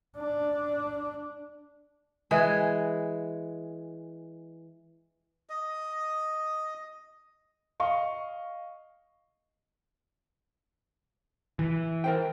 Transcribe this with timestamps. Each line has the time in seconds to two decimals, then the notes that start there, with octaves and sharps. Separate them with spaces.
0.17 D4
2.31 E3 G#3 G#4
5.49 D#5
7.80 D#5 F5 C#6
11.59 E3
12.04 A#4 C5 G5